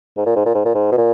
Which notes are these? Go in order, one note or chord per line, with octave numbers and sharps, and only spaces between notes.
G#2
A#2
G#2
A#2
G#2
A#2
G#2
B2
A#2